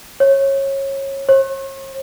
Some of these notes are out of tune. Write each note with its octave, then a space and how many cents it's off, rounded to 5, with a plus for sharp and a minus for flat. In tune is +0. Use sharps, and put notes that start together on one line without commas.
C#5 -25
C#5 -45